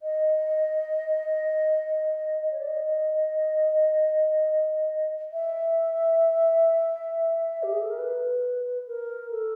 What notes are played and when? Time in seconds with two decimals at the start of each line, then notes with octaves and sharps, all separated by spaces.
0.02 D#5
2.51 C#5
2.60 D5
2.67 D#5
5.33 E5
7.63 G4
7.72 G#4
7.81 A4
7.90 A#4
7.98 B4
8.87 A#4
9.31 A4